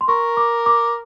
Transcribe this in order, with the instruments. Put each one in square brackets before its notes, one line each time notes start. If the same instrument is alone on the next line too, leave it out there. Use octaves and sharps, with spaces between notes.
[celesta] C6
[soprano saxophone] A#4 [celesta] C#6
[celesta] D6
D6